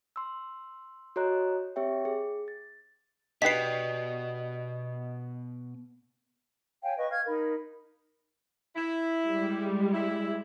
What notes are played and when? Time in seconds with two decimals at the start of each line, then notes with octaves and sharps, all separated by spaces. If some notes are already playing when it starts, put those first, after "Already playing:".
0.16 C6 E6
1.16 F#4 A4 C#5 D#5 A#5 F#6
1.76 C4 G4 C#5 E5 G5
2.05 G#4
2.48 A6
3.42 B2 D4 G4 B4 D#5 B6 C7
6.83 C#5 F5 G5 G#5
6.97 B4 D#5 C#6
7.10 F5 F6 G#6
7.26 D#4 A#4 B5
8.75 E4
9.29 G3 G#3
9.93 E4